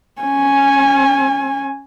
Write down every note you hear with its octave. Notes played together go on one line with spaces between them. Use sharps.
C#4 G#5